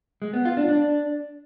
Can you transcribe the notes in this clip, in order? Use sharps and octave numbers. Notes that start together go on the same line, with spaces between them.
G#3
B3
F4
D4
D4